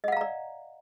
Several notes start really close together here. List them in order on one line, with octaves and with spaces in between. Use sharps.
D#5 F#5 F5 A#5 D5